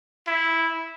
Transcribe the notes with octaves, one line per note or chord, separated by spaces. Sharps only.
E4